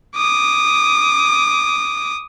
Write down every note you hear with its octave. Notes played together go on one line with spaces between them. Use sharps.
D6 D#6